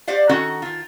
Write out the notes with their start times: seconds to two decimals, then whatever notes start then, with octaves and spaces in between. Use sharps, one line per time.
0.08 G4 C5 D5 F5 F#5
0.29 D#3 C#4 F#4 A4 F#5
0.62 D#3 F4